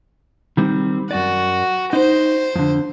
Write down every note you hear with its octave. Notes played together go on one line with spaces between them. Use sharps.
D#3 G3 C4
F#2 F#4 D5
D#4 C5
F2 D3